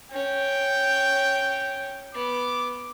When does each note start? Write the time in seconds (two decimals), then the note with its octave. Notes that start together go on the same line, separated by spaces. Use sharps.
0.12 C#4 C#5 G5
2.14 B3 D6